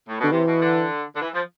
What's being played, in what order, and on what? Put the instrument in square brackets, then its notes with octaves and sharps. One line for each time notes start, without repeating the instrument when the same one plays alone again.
[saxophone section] A2
[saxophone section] B2 [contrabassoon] D3
[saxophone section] C3 [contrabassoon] E3
[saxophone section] B2
D3
D3
E3
F3